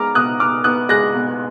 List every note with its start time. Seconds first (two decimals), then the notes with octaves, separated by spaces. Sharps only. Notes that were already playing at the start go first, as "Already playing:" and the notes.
Already playing: G#3 B3 A#5 D6 F6
0.15 B2 D#6 F#6
0.40 B2 D6 F6
0.64 B3 D#6 F#6
0.89 G#3 F#6 A#6
1.15 B2